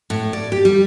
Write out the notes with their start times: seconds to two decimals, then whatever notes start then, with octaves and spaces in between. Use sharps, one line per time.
0.10 A2
0.33 D5
0.52 G4
0.65 G3